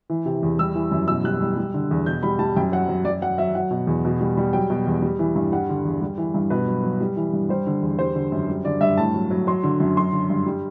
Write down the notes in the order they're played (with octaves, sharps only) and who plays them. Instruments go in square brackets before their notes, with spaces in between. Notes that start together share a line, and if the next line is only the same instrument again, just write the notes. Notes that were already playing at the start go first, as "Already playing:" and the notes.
[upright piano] E3
C3
E2
G3 E6
E3
F#2
B2 E6
G3 F#6
G3
G3
D3
E2
B2 G6
G3 B5
G3 A5
F#2 G5
F#3 F#5
F#3
F#2 D5
F#3 F#5
F#3 E5
F#3 F#5
B2
E2
B2
G3
G3
F#3 G5
B2
E2
G3
E3
G2
G3 F#5
D3
E2
G3
E3
G2
B2 B4
F#3
F#3
G3
E3
G2
G3 C5
D3
E2
G3 C5
D3
F#2
G3
D3 D5
G2 E5
A2 A5
F#3
F#3
F#3 C6
D3
F#2
F#3 C6
D3
G2
G3